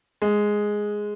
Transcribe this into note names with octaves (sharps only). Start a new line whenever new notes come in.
G#3